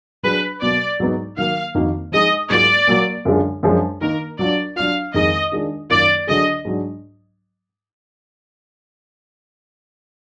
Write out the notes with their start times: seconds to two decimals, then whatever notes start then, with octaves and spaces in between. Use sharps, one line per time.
0.23 F#3 D4 G#4 B4
0.61 B2 F#3 A#3 D5
1.00 G#2 F#3 B3 D#4
1.37 D#3 F#3 A#3 F5
1.75 F2 D#3 A#3 D#4 F#4
2.12 F3 G#3 D#4 D#5
2.50 G#2 F#3 A#3 F4 D5
2.87 A#2 F#3 A#3
3.25 F#2 D3 G#3 D4 F4
3.63 F#2 F3 G#3 D4
4.01 D#3 A#3 D#4 A#4
4.39 F#3 D4 F4 D5
4.76 F#3 D4 F4 F5
5.14 F2 D#3 G#3 D#4 D#5
5.52 D#3 G#3 D4 F4
5.90 F#2 D#3 A#3 F4 D5
6.27 D3 F#3 D4 G#4 D#5
6.65 G#2 F#3 D4